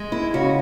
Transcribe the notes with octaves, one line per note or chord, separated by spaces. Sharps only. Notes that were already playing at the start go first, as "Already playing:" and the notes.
Already playing: G#3
E4
C#3 F#4